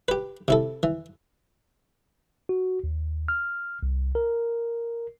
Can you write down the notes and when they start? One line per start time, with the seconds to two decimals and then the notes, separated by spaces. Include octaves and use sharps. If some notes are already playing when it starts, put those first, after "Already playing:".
0.08 G4 B4
0.48 C3 E4 A4
0.83 E3
2.49 F#4
2.84 D#2
3.28 F6
3.83 C2
4.15 A#4